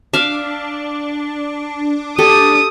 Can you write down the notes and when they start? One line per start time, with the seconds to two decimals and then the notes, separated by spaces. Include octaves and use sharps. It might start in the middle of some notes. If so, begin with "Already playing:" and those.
0.13 D4 E5 F5
2.18 G4 A4 D#6